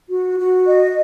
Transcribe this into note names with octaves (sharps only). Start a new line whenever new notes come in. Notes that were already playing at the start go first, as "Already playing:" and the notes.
F#4
F#4
D#5